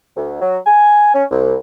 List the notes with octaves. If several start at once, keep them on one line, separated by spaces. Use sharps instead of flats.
D2
F#3
G#5
C#4
C2